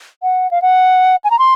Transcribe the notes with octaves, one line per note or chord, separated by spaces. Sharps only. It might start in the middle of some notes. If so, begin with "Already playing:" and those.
F#5
F5
F#5
G#5
A#5
C6